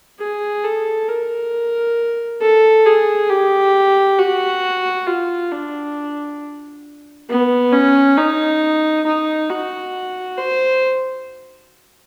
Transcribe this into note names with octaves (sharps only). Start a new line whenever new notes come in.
G#4
A4
A#4
A4
G#4
G4
F#4
F4
D4
B3
C#4
D#4
D#4
F#4
C5